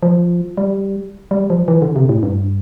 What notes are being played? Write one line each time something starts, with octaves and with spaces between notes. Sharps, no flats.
F3
G3
G3
F3
E3
D3
C3
A2
G2